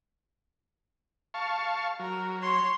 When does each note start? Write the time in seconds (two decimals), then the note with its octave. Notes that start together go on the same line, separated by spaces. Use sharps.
1.34 F5 A5 C#6
1.99 F#3 A#4
2.42 C#5 C6